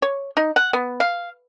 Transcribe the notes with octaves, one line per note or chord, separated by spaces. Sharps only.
C#5
D#4
F#5
B3
F5